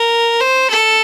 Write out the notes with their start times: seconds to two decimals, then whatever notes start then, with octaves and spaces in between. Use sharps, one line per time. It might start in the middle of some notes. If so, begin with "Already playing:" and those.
Already playing: A#4
0.41 C5
0.70 A4